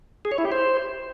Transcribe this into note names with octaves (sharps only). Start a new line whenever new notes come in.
G#4
C#5
E4
G4
C5